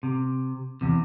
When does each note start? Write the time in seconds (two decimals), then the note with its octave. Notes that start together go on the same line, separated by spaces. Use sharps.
0.03 C3
0.81 E2 C3